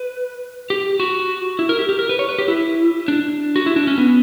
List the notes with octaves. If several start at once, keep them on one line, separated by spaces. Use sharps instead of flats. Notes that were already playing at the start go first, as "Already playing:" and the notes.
Already playing: B4
G4
F#4
E4
A#4
G4
G4
A#4
B4
C#5
B4
G4
E4
D4
F#4
E4
D4
C#4
B3